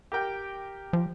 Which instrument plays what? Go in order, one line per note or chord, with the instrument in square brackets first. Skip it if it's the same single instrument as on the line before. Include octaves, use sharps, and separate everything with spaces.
[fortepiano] G4 A#4 G5
[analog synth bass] F3